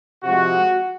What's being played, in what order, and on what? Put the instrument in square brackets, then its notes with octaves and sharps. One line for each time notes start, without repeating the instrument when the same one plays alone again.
[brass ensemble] C3 F3 G#3 F#4